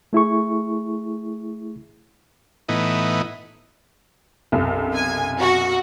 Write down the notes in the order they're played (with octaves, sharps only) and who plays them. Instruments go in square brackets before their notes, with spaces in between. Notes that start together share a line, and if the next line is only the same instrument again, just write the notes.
[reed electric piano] A3 E4 G#4 C#6
[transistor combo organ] A2 E3 B3 D#4
[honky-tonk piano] B1 F#2 C3
[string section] G#5
F#4